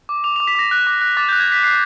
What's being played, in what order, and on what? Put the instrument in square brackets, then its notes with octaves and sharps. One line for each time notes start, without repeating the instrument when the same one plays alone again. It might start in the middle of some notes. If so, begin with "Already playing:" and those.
[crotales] D6
D6 F7
D6 F7
B6
D6 A#6
F#6
D6
F#6
D6 A6
F#6 G6
G#6
F#6 B6
F#6 C7